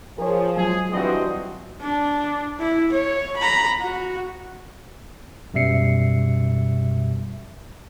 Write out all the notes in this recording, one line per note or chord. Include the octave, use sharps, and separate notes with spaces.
F3 G#4 A#4 C#5
F#3 G#3 F4 G#4
G2 E3 C4 F#4 D#5
D4
E4
C#5
A#5 B5
F#4
F#2 B2 G3 E5 C7 C#7